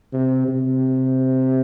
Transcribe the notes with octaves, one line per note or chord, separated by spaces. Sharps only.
C3
C3